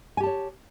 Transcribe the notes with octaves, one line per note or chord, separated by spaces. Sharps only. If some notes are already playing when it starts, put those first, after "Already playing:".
G4 C#5 G#5 A5